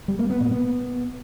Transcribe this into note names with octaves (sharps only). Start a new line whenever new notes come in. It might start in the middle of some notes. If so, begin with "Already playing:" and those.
G3
A#3
B3
A#2
B3